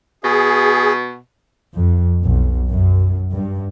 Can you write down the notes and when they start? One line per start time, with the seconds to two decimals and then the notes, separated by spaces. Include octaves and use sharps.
0.24 B2 G#4
1.73 F2
2.23 B1
2.69 F#2
3.32 G2